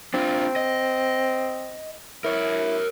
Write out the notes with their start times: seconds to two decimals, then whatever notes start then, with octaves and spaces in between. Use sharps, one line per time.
0.14 C4 D4 F4
0.56 D#5
2.25 E4 A#4 C#5